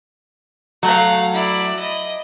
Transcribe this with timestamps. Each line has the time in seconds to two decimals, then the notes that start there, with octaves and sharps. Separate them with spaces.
0.83 F#3 A3 F5 F#5
1.33 E4 D5
1.79 D#5